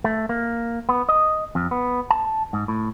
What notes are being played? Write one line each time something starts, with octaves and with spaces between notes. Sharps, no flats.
A3
A#3
B3
D#5
F2
B3
A5
G#2
A2